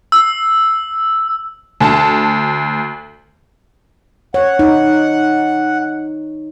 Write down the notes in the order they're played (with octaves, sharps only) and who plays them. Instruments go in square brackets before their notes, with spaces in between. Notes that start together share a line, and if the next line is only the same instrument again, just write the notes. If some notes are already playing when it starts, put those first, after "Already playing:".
[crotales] E6
[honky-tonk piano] D2 A5
[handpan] C#5 [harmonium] F#5
[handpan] D#4